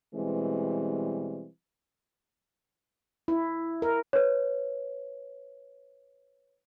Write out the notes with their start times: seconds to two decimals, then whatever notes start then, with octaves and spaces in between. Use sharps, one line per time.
0.15 B2 E3 G3 G#3 C4
3.28 E4
3.82 A#4
4.13 B4 C#5